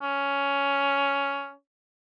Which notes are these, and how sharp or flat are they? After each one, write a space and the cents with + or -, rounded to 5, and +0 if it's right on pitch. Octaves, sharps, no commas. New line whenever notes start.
C#4 +10